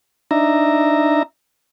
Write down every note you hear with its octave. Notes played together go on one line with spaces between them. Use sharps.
D4 D#4 E5 A#5